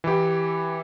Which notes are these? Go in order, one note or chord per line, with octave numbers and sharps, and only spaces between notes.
E3 E4 G4